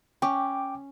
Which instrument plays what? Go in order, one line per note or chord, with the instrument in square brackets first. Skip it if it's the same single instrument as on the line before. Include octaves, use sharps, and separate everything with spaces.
[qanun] C#4 [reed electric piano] G5 D6